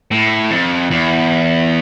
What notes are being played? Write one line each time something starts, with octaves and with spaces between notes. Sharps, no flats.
A2
F2
E2